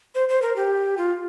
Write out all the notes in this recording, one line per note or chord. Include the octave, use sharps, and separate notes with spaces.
C5
C5
A#4
G4
F4